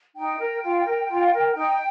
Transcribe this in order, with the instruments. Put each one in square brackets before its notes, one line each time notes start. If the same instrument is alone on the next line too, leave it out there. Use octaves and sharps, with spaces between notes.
[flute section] D#4 G5
A#4
F4
A#4
F4
A#4
D#4 G5